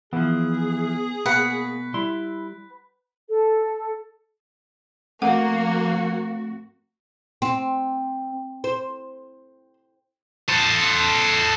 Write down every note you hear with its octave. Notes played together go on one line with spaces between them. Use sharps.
E3 F3 B3 G#4
B2 A#3 B4 F#5
G3 E4 C6
A4
F3 A3 A#3 C4 F#4 F#5
C4
C5
A4 C5